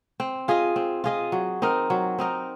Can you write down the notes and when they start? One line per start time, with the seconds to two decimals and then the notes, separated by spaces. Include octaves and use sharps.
0.20 C4
0.48 F4 G#4 D#5
0.76 C4
1.04 F4 G#4 D#5
1.32 F#3
1.62 C4 D#4 A#4
1.90 F#3
2.18 C4 D#4 A#4